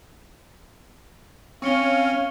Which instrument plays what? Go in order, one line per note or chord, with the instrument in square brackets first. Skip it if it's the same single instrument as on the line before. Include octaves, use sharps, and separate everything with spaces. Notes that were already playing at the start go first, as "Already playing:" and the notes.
[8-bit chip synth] C4 C#4 [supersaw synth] C#5 F6 [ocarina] F5 [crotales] C#6 C#7 G7